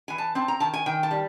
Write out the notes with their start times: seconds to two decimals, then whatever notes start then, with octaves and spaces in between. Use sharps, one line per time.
0.08 E3 G#5
0.18 A5
0.35 C4 A5
0.48 A#5
0.60 D#3 A5
0.74 G#5
0.86 D#3 G5
1.03 A5
1.11 G3